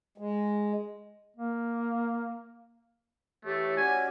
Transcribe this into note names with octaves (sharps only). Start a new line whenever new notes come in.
G#3
A#3
E3 A3 G4 C#5
C#4 F#4 D5 G#5